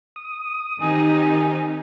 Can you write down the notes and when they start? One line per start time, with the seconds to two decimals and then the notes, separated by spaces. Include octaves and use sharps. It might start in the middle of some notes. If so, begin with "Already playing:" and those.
0.16 D#6
0.80 D#3 C4 D#4 G4 G#5